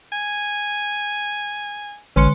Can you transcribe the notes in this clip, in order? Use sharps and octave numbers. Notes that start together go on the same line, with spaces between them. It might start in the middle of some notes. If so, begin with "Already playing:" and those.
G#5
A1 D3 C#4 C6 C#7